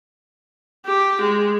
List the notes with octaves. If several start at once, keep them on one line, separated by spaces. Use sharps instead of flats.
G4
G#3